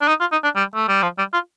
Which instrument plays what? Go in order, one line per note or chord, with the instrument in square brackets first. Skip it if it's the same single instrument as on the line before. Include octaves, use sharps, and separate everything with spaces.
[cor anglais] D4
D#4
F4
D#4
D4
G3
A3
G3
F3
G3
F4